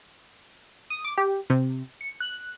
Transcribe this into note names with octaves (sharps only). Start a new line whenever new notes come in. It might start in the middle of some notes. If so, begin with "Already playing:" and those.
D#6
D6
G4
C3
C#7
F#6